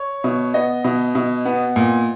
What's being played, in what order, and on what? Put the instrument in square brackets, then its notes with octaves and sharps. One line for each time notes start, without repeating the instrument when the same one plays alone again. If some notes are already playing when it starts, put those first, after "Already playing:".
Already playing: [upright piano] C#5
B2
B3 D#5
B2
B2
B3
A#2